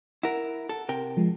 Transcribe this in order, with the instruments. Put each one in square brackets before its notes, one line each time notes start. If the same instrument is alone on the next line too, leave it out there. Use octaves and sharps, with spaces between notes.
[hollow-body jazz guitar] E4 A#4 [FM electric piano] F#5
[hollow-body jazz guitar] A4
C3 A#4 G5
[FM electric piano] F3 G#3